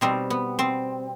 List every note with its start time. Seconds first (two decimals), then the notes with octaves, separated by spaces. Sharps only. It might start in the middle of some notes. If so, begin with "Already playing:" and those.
0.01 B2 G3 C4
0.30 B3
0.59 C4